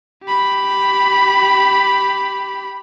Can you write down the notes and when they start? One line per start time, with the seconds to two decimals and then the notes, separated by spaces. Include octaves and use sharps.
0.24 G4 B5